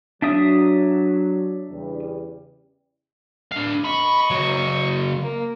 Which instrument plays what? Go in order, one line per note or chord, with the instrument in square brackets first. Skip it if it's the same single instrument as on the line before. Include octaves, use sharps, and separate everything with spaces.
[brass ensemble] F#3 [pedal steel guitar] D4 E5 D#6
[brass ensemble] E2 C#3 G3
[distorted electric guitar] D4 F5
[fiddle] D#5 C#6 [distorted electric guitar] B5
[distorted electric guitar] C#3 F#3
[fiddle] A#3